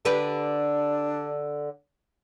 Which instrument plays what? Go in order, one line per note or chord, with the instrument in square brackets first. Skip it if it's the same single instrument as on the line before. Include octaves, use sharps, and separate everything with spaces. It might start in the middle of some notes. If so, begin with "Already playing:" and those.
[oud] D3 G4 B4 [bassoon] D4